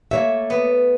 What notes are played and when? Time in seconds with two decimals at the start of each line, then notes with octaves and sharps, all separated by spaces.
0.11 A3 A#3 C#5 E5
0.50 B3